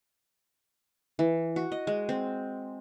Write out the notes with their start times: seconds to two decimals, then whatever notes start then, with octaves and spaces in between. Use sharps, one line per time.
1.19 E3
1.56 F#4
1.72 D#5
1.87 G#3
2.09 C4